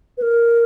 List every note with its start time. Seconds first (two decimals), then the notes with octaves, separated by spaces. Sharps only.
0.17 B4
0.22 A#4